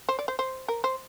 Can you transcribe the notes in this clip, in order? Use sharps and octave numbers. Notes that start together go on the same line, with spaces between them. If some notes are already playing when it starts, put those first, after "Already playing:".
C5
D5
C5
C5
A#4
C5